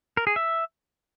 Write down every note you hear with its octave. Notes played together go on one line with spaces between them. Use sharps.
A#4
G#4
E5